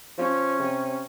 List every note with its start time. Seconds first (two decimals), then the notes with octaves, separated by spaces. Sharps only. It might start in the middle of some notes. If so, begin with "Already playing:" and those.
0.18 F3 C#4
0.60 C3